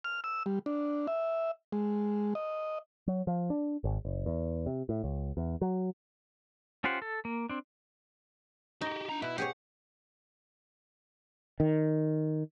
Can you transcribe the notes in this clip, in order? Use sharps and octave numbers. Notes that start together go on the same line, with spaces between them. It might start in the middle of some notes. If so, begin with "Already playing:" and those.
F6
E6
G3
D4
E5
G#3
D#5
F#3
F3
D4
G#1
F#1
E2
C3
A2
C#2
E2
F#3
C#4 F4 G4 C5 F#5
A4
A#3
C4 D4
D#4 F#4 G4
D4 A#5
B2 E4
G4 G#4 C#5 F#5
D#3